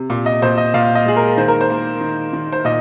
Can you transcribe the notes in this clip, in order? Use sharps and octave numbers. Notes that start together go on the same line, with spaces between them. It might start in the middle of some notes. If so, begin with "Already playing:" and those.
Already playing: C3
A#2
D#5
A#2 C5
D#5
A#2 F5
D#5
G#3 G#4
A#4
D#3 C5
A#4
C5
A#3
D#3
D#3
C5
A#2 D#5